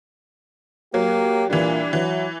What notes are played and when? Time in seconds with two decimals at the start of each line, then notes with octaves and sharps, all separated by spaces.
0.94 F#3 A#3 G4
1.50 A#2 E3 G3 D4
1.93 E3 F#3